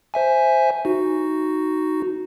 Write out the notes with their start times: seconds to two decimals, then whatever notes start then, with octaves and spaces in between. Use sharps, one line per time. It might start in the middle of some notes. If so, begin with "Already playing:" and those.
0.14 C5 E5 G#5
0.85 D#4 F#4